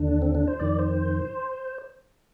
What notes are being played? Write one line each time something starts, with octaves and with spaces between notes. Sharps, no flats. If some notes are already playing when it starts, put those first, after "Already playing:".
Already playing: D#2 D3 D4
C4
D4
C5
F2 D#3 D5
C5